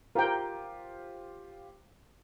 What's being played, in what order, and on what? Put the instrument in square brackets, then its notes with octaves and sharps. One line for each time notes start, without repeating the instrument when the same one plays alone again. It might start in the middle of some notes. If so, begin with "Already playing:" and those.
[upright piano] F4 G4 C5 [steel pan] A#4 G5